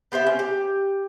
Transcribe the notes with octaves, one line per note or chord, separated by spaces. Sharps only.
B3 G4 C5 E5
C#4
G4